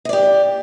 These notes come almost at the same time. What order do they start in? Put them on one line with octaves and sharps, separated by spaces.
D#5 D5 G4